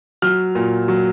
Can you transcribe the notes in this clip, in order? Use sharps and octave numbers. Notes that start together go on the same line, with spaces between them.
F#3 F6
A#2
F#3